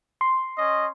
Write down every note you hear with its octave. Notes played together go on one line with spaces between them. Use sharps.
C6
C#4 D#5